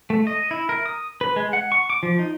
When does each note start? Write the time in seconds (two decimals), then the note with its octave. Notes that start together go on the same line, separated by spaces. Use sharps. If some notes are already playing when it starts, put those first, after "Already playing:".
0.10 A3
0.27 D#5
0.51 E4
0.69 A#4
0.86 D#6
1.21 B4
1.36 G#3
1.53 F#5
1.72 C#6
1.90 D6
2.03 F3
2.19 D#4